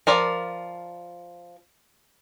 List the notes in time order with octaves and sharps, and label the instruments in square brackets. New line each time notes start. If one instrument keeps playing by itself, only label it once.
[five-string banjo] F3 A#4 D5